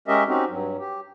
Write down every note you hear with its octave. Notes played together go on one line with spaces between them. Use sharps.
G#3 C#4 G4 A#4 D#5 E5
C4 C#4 D#4 F#4 G4
G2 F#3
G4